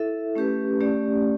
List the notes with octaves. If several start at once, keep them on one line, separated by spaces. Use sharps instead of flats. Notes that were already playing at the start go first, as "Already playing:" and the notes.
Already playing: E4 A4 E5
A3 C#4 G4 B4
A3 C#4 G4 D5